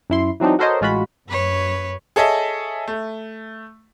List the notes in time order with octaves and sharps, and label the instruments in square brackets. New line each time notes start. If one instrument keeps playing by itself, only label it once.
[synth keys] F#2 E4 C6
E3 F#3 C4 D4 D#4
F#4 A4 A#4 C5 C#5 D#5
A1 G#3 F4 F#4 B5
[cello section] F#2 [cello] B4 C#5
[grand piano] G#4 A4 C#5 D#5 E5
A3